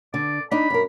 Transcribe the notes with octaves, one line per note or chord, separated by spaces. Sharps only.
D3 D5
D4 D#4 B5
F#2 A#4